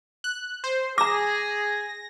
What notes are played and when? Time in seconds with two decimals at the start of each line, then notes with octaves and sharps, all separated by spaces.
0.24 F#6
0.64 C5
0.98 G#4 A#5 D6 A#6